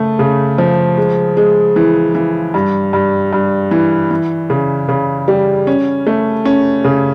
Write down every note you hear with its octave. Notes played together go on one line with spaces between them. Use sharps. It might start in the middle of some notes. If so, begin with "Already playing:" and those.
Already playing: C#3 A3
C#3
F3
G#3
G#3
E3
E3
G2
G2
G2
E3
E3
C#3
C#3
G3
C#4
A3
C#4
C#3